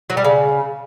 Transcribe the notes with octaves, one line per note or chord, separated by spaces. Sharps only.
F#3
G3
C#3